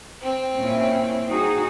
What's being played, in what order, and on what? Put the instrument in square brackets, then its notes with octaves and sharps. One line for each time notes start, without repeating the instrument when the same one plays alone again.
[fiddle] C4
[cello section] A#2 C#4 E4
D#4 F#4 G#4